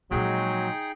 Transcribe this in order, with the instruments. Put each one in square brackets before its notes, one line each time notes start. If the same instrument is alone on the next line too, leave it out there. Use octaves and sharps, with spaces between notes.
[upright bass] A#2 F3 [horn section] F#3 G#3 [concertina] D#4 G#4 G5